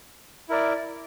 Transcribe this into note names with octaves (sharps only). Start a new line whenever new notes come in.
E4 A#4 D5